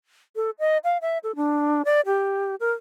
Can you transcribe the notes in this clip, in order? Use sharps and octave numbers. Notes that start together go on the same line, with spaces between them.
A4
D#5
F5
E5
A4
D4
D5
G4
A#4